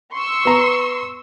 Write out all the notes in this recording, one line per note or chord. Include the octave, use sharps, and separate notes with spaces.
C6 C#6 E6
B3 A#5